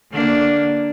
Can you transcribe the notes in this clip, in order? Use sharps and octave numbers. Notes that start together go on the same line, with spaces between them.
D3 A#3 D4